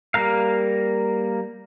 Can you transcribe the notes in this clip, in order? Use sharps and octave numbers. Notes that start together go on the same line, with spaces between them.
G3 A#3 A#4 F5